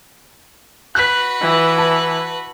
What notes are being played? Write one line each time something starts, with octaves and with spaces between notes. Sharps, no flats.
F#4 B4 F#6 B6
E3
A5